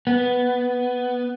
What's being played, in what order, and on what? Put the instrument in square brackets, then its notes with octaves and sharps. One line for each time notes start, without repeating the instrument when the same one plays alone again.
[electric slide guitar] B3